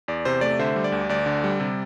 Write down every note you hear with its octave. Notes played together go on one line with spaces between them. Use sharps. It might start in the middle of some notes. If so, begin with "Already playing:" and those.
E2 D5
C3 C5
A3 D5
D3 C5 E5
G3
D5
D2
D2 D5
D3
G3
C3